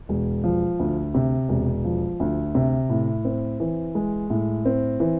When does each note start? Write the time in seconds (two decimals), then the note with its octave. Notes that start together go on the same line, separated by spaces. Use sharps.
0.09 E1
0.44 F3
0.79 D2
1.14 C3
1.49 E1
1.84 F3
2.20 D2
2.55 C3
2.90 A2
3.25 C4
3.60 E3
3.95 G#3
4.30 A2
4.65 C4
5.00 E3